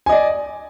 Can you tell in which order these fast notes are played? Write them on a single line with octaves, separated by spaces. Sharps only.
G#5 D#5 D5